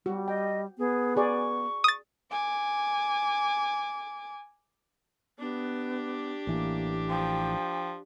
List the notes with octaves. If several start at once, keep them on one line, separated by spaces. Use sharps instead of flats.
G3 F#4
D#5 G5
B3 G#4
F#4 G#4 D5 C#6
D#6 A6
G#5 D6
B3 D4 G4
A1 E3 A#3
F3 G5